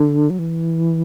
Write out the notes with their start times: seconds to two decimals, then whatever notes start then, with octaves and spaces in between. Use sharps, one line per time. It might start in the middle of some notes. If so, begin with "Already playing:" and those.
Already playing: D3
0.30 F#3
0.39 E3